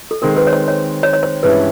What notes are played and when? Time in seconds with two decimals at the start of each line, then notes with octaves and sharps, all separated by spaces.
0.11 A4
0.22 D#3 G#3 C4 A#4
0.36 B4
0.47 C#5
0.53 C5
0.68 C#5
1.03 C#5
1.13 C#5
1.23 C5
1.43 G2 E3 G#3 C#4 E4 B4